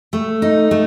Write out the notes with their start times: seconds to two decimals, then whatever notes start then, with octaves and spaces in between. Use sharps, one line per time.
0.13 A3
0.42 D#4
0.71 A3